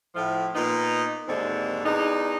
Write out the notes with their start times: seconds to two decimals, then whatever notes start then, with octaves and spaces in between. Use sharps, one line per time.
0.15 A2 F3
0.55 A#2 B3 D#4
1.28 D#2 G#2 D3 C4
1.85 E2 D4 D#4